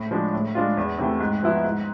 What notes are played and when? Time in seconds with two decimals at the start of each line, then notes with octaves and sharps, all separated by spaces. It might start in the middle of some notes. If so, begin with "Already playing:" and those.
Already playing: A2
0.11 F3 G#3 D4
0.33 A2
0.55 G#3 D4 F4
0.77 E2
0.98 C3 E3 A3
1.20 G#2
1.43 F3 B3 E4
1.64 G#2